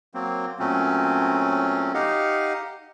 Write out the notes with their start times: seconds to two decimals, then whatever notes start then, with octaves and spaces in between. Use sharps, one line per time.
0.14 F#3 A#3 C4
0.59 A#2 F#3 A3 C4 C#4
1.94 D#4 G4 D#5 F5 F#5